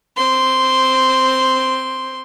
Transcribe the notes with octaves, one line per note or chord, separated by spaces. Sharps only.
C4 C6